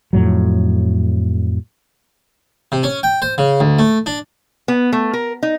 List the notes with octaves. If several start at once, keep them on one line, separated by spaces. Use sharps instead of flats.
F2 A2 F#3
C3
C#4
G5
C5
C#3
D2
A3
D4
B3
A3
A#4
D#4